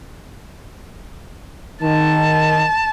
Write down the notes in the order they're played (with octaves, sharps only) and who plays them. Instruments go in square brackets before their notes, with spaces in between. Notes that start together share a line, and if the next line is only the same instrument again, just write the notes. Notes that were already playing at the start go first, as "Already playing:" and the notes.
[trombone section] D#3 [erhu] A5